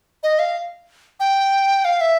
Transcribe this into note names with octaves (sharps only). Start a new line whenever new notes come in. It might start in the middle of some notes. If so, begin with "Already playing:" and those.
D#5
F5
G5
F5
E5